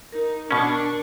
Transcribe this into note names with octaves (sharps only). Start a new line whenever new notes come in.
D#4 A#4
B2 C#4 D4 C#6